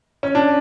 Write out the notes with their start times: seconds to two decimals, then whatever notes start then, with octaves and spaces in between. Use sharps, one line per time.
0.23 C#4
0.35 D4